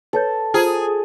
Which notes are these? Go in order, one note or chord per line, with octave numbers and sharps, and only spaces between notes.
A4 B4 C#5 G6
F4 G#4 C5 A#5